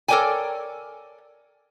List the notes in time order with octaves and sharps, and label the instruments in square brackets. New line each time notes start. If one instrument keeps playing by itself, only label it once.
[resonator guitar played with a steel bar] A4 A#4 C#5 D5 G5 G#5